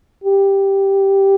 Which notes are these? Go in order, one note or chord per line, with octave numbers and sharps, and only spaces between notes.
G4